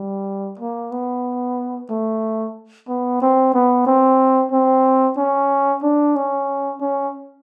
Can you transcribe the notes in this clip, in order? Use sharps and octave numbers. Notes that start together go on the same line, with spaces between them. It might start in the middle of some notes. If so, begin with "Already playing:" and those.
Already playing: G3
A#3
B3
A3
B3
C4
B3
C4
C4
C#4
D4
C#4
C#4